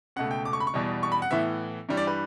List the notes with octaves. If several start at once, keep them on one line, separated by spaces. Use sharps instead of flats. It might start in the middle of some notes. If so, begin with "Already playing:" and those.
C#2 B2 A3 F#5
G5
D6
C#6
B5
C#6
E2 B2 G3
C#6
B5
F#5
A2 E3 B3 E5
G2 E3 G3
D5
B4